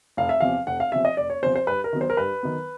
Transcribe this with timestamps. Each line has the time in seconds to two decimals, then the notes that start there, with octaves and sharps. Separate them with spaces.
0.17 F1 F5
0.29 E5
0.40 E2 C3 F3 F5
0.67 F1 F#5
0.80 F5
0.92 E2 C3 F3 E5
1.05 D#5
1.17 F1 D5
1.30 C#5
1.42 E2 C3 F3 C5
1.56 C5
1.67 G2 B4
1.84 A#4
1.93 D#3 F#3 B3
2.01 C5
2.10 A#4
2.17 G2 B4
2.43 D#3 F#3 B3